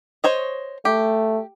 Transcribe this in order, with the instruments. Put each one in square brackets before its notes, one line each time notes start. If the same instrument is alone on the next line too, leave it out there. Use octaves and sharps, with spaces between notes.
[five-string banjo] C5 C#5 D#5
[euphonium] A3 [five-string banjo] G4